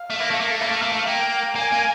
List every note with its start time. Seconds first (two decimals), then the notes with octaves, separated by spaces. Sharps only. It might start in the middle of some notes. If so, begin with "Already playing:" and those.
Already playing: F5
0.10 A3
0.20 A#3
0.31 A3
0.40 A#3
0.51 A3
0.59 A#3 F5
0.71 A3
0.82 A#3
0.92 A3
1.07 A#3 G5
1.55 A#3 G#5
1.72 A#3